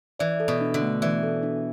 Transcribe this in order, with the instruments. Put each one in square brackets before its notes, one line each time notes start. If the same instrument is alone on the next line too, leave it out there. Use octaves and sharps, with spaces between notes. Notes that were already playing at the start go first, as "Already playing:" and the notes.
[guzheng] E3 [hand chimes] D5
[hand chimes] A4
[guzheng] B2
[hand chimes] D4
[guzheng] D3
[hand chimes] A3
[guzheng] E3 [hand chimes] D5
[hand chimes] A4
D4